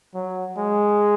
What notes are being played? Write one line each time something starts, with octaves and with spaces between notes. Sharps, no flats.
F#3
G#3